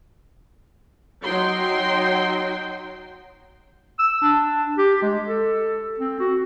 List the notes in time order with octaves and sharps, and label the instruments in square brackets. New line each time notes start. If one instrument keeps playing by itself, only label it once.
[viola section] F#3 D#4 G5 C6
[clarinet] E6
D4
G4
G#3
A4
C4
F#4